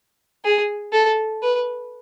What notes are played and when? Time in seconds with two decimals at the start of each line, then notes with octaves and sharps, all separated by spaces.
0.45 G#4
0.93 A4
1.43 B4